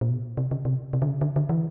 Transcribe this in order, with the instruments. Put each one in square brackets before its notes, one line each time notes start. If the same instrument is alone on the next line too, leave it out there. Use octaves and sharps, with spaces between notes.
[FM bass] A#2
B2
C3
C#3
C3
C3
D3
C#3
D3
D3
E3